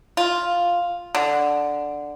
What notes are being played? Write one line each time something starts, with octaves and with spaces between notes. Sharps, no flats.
F4
D3